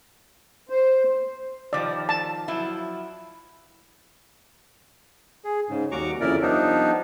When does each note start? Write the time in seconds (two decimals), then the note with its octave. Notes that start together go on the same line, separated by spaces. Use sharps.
0.69 C5
1.73 D#3 F3 G3 D5
2.09 A5
2.48 F3 F#3 E4
5.44 G#4
5.69 G#2 C#3
5.91 D#2 G3 F#4 A#5 C#6 D6
6.21 F2 C#3 E4 A#4 D5
6.42 F3 G3 B3 D4 D#4